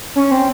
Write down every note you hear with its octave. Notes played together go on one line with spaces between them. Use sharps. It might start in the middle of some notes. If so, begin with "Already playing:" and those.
C#4
C4